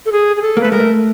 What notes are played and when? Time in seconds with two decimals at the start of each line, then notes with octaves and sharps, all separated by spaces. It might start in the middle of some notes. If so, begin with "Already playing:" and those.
0.06 A4
0.12 G#4
0.36 G#4
0.42 A4
0.57 A#3
0.61 A3 B4
0.71 G#3 A#4
0.80 A3